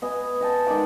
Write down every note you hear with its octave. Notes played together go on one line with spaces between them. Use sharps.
B3 D#5 G#5
D#5 G5 A5
D#3 G#3 D5 F#5